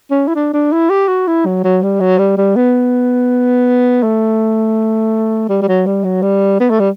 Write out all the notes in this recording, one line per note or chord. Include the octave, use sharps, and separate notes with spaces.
C#4
E4
D4
D4
E4
G4
F#4
E4
F#3
F#3
G3
F#3
G3
G3
B3
A3
G3
G3
F#3
G3
F#3
G3
B3
A3
G3